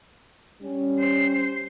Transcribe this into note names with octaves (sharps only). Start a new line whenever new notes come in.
G3 C#4
C5